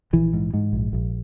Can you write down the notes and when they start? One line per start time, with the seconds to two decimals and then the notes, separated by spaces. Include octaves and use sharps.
0.13 A#1 E3
0.33 G#2
0.54 G#2
0.73 A#1
0.93 A#1